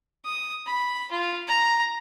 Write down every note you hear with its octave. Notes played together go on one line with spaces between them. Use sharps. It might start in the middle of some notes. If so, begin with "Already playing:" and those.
D#6
B5
F4
A#5